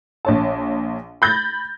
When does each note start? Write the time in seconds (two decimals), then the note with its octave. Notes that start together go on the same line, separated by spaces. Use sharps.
0.25 A#1 C#5 A5
1.22 B5 G6 A6 A#6